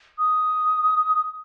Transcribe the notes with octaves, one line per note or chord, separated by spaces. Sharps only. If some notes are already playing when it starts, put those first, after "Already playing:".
D#6